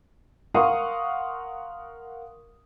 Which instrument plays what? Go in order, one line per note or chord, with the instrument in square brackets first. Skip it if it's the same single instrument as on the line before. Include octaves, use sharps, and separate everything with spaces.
[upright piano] A#4 F5 F#5 C6 C#6 D#6